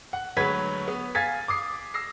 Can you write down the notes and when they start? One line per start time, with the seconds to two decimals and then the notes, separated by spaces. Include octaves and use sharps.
0.13 F#5
0.36 D2 F#3 G#3 B4 G#6 B6
0.88 B3
1.15 F5 G#5 G#6 A6 B6
1.48 D6 D#6 C7
1.94 E6 A#6 C7